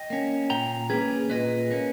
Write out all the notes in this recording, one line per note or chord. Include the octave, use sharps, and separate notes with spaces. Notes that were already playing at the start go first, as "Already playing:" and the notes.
Already playing: D#5 G5
A#3 C#4
A#2 G5 A#5
A#3 C#4 G#4 B4
A#2 B4 D#5
A#3 C#4